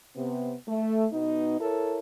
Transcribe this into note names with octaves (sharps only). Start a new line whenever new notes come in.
C3 B3
A3
B2 B3 D#4
E4 A4 A#4 C#5